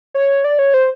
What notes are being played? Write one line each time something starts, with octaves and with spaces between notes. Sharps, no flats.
C#5
D5
C#5
C5